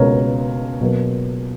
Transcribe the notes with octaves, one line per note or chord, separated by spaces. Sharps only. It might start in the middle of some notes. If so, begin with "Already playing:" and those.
Already playing: C#2 B2 A#3 A#4 C#5
B2 F#3 A#3